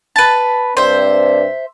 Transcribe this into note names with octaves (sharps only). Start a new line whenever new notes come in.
B4 A5
G2 C4 D4 C5 E5